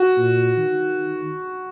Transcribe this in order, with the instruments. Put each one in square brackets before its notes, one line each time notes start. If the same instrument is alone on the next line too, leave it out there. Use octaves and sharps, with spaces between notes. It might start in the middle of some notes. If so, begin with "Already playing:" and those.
Already playing: [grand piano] F#4
[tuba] A#2
D#3